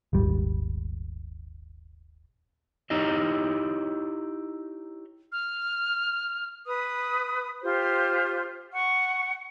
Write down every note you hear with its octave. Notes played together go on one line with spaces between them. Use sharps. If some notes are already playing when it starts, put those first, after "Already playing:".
D#1 G#1 G3
D#4 E4 G4 C#5 D#5
F6
B4 D#6
F4 G4 C5 C6
F#5 C#6